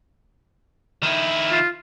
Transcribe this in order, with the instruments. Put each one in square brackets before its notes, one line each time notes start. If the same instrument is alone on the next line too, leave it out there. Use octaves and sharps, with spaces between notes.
[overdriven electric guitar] D#3 E4
[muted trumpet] F4